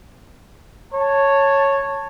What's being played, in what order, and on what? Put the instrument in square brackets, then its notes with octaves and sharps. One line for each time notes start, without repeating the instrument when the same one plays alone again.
[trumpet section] C#5 A5